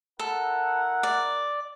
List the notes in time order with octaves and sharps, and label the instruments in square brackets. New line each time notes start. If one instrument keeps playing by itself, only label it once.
[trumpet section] E4 A#4 F#5 [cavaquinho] A4
[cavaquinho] D5